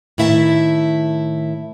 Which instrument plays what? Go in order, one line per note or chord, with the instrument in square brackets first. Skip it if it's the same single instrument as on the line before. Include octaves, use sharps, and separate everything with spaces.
[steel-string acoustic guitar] A2 D#3 E4 E5 F5 A5